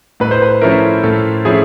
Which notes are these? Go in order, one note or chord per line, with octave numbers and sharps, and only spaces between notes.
A2 B4
C5
B4
F3 A3 C#4 E4 A#4
A2 A4
F3 A3 C#4 E4 G#4